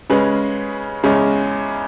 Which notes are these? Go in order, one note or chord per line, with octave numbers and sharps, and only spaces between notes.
C#3 G#3 C#4 G#4 B4
E2 C#3 G#3 C#4